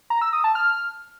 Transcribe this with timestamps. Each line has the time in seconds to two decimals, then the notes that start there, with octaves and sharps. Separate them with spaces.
0.10 A#5
0.22 E6
0.33 D#6
0.44 A5
0.55 F6